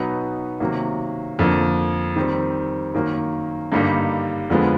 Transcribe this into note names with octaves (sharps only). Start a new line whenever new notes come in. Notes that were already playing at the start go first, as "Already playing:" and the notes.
Already playing: B2 F#3 B3 D#4
C3 D#3 F#3 A#3
F2 D3 F3 A#3
D#3 G3 C4
F#2 D#3 F#3 A#3
G2 D3 G3 A#3 D#4
F2 D3 F3 G#3 B3